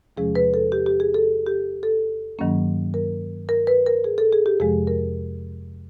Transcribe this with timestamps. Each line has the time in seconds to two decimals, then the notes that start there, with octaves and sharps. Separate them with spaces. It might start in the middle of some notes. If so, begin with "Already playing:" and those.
0.17 E2 C3 F3 G#3 C#4 G#4
0.35 B4
0.54 A4
0.72 G4
0.86 G4
1.00 G#4
1.14 A4
1.46 G4
1.83 A4
2.39 G2 D#3 F#3 A#3 C#4
2.94 A#4
3.49 A#4
3.67 B4
3.86 A#4
4.04 G#4
4.18 A4
4.33 G#4
4.46 G4
4.60 F2 C3 F3 G#3 G#4
4.87 A#4